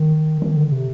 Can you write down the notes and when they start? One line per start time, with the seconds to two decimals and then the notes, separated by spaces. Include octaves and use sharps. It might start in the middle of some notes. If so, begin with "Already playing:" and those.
Already playing: D#3
0.42 D#3
0.57 D3
0.72 C3